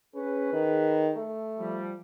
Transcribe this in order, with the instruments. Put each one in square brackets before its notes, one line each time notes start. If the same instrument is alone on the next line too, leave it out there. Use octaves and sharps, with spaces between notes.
[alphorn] C#4 [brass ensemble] G#4 B4
[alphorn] D#3
A3
[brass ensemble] F3 G3